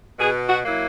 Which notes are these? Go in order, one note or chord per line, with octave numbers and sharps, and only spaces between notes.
B2 G#4
F#4
F#3 A#3 E4